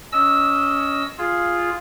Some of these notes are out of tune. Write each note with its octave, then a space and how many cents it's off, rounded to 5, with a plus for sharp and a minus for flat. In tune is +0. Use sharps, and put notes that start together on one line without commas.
C#4 +20 D#5 +0 E6 -10
F4 +0 G#4 +0